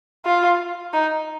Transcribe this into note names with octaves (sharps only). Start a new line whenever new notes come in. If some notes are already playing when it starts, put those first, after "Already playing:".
F4
D#4